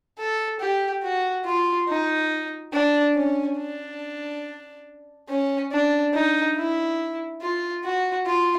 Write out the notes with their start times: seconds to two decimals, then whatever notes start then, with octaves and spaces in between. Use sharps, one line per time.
0.19 A4
0.60 G4
1.03 F#4
1.45 F4
1.89 D#4
2.73 D4
3.16 C#4
3.58 D4
5.29 C#4
5.72 D4
6.14 D#4
6.57 E4
7.42 F4
7.84 F#4
8.27 F4